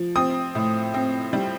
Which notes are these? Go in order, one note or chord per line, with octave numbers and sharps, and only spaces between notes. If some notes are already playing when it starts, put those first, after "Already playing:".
Already playing: F3
C4 D#6
A2
C4
G3